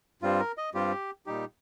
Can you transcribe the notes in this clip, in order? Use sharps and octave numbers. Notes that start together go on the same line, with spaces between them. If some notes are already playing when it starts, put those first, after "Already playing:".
G2 G3 C4 F4
A#4
D#5
G2 G3 C4 F4 G4
A#2 G3 D#4 G4